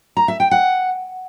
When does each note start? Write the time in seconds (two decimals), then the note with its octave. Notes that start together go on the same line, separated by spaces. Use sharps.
0.17 A#5
0.28 E5
0.40 G5
0.51 F#5